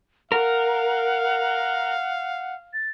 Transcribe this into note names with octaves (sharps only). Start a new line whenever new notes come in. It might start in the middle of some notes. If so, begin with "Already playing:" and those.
A#4 F5 F#5
A6